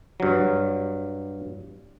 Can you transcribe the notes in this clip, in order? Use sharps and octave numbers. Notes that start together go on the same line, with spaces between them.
G2 F#3